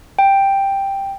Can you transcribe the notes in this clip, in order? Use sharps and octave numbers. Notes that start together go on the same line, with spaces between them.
G5